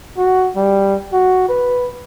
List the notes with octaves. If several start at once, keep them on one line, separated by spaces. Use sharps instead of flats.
F#4
G3
F#4
B4